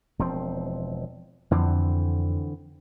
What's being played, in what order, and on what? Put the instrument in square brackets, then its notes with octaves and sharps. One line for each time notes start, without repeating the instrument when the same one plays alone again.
[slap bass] E1 F3 C4
[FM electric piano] F2 [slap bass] D3 E3 C4